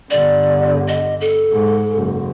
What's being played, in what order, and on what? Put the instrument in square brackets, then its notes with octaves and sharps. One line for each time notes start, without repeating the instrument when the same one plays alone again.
[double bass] G1 D3 [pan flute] D5
[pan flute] D#5
A4
[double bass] G#2
F#1